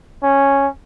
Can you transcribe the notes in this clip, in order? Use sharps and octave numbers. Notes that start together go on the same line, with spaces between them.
C#4